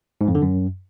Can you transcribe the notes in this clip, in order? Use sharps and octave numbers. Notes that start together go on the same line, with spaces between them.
G#2
F2
D3
F#2